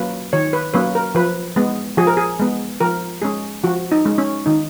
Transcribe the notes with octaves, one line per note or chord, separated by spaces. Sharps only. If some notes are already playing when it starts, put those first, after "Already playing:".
Already playing: F#3 A#3 C#4 B4
D#3 C#5
B4
F#3 A#3 C#4 B4
A#4
F3 B4
G#3 B3
F3 G#4
A#4
G#4
G#3 B3
F3 A#4
G#3 C#4 G#4
F3 F#4
D#4
G#3 C#4
C#4
D#3 D#4